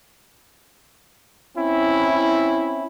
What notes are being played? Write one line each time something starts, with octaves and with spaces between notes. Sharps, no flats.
C4 C#4 E4